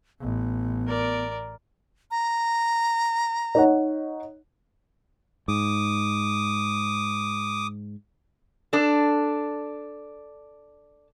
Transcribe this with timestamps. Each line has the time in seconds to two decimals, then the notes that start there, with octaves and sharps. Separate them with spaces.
0.21 A1 B3
0.87 A#4 D5
2.11 A#5
3.55 D#4 C#5 F#5
5.48 G#2 D6 D#6
8.73 D4 A4